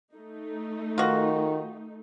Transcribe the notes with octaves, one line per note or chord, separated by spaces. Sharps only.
A3 D#4
D#3 F4 F#4